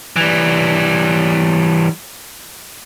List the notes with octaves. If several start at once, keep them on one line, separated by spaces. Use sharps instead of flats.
E3 G3